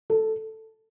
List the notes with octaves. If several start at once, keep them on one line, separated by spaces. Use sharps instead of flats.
A4